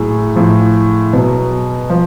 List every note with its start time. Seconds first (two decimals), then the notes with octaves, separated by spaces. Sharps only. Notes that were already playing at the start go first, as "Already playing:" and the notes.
Already playing: A2 F#3 G#4
0.35 A2 F3
1.13 B2 F#3
1.90 F3